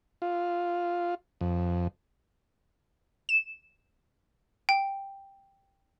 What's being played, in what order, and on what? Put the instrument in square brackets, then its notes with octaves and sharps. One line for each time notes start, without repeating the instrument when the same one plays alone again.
[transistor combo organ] F4
F2
[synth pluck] E7
[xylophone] G5